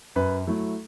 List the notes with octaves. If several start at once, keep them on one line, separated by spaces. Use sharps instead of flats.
F#2 B4
F#3 A3 E4